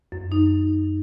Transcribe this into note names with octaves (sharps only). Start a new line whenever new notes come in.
F#2
D#4